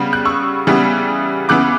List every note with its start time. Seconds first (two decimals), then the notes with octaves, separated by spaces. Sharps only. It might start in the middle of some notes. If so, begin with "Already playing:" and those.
Already playing: C#3 G3 B3
0.13 F#6
0.25 C#6 E6
0.67 C#3 E3 G3 B3
1.49 C#3 E3 B3 D6 F#6